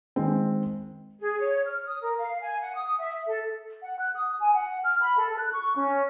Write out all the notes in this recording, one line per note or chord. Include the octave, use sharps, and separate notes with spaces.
D#3 G#3 C4
G#4
C#5
F6
D#6
A#4
F5
G#5
F#5
D#6
E5
A4
F#5
F#6
D#6
G#5
F#5
F6
B5
A4
F#6
C#6
C#4